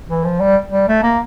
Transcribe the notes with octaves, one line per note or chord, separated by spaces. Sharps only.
E3
F3
G3
G3
A3
A#3